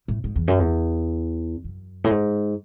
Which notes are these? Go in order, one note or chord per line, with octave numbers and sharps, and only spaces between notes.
A2
G#2
E2
F#2
E2
F#2
A2
G#2